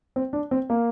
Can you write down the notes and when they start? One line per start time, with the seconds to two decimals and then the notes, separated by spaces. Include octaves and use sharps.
0.16 C4
0.33 D4
0.51 C4
0.70 A#3